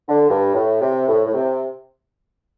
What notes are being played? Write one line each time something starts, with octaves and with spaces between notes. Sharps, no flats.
D3
G2
A2
C3
A2
A2
C3